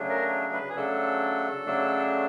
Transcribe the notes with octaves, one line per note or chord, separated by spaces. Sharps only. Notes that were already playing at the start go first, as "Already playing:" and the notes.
Already playing: C#3 F#3 A3 D4
A#4
B4
G#4
C#3 F#3 A3 D4 A4
C#3 F#3 A3 D4